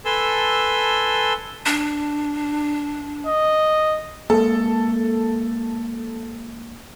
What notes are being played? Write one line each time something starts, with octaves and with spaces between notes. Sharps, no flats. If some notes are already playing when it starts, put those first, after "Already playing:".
A4 B4 G#5 A5 C6 E6
D4
D#5
G#3 A#3 A4